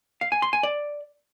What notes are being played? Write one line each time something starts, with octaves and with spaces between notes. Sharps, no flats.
F5
G#5
C6
G#5
D5